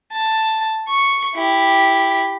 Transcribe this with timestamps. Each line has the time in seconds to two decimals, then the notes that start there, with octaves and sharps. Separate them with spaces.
0.12 A5
0.89 C#6
1.35 E4 G4